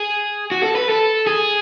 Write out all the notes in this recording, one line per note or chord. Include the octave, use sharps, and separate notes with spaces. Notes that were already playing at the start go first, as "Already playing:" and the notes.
Already playing: G#4
F#4
A4
B4
A4
G#4